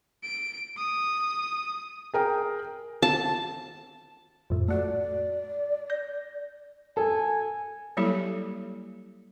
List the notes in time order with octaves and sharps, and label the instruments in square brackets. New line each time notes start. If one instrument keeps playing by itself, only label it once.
[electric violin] D7
D#6
[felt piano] G#4 A#4 G5
[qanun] A5
[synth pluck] F2 A2
[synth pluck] A3 F#4 [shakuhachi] D5
[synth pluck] G6 A#6
[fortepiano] A4 [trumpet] G#5
[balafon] F#3 G3 A#3 E4 G4 A4